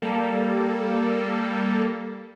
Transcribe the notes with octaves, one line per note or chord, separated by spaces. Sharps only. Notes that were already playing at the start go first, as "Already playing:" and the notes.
G3 A#3 A4